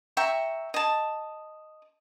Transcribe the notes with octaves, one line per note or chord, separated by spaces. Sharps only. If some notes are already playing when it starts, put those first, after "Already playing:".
E5 G5 A#5 C#6
D#5 A5